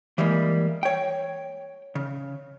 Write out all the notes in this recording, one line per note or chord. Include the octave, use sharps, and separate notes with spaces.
E3 G3 G#3 A#3
C#5 G5
C#3